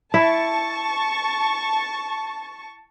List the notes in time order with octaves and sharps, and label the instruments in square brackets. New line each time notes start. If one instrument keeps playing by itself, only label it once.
[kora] E4 [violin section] A5 C#6